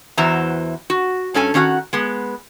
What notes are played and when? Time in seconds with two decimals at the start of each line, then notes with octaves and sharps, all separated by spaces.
0.17 E2 E3 F#4 C5 E5 A#5
0.90 F#4
1.34 G2 C#4 A4 G#5
1.54 D#3 C#4 D4 F#4 F#5
1.93 G#3 B3